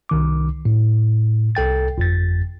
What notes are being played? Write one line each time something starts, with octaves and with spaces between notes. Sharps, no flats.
C2 D#3 D6
A2
C2 A4 G5 A6
G1 F2 A6